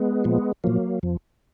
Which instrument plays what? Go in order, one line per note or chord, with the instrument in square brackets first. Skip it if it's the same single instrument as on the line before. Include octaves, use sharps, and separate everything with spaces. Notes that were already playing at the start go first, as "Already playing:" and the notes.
Already playing: [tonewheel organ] G#3 B3
A#2 F3
A#2 F3 F#3 A#3
F2 F3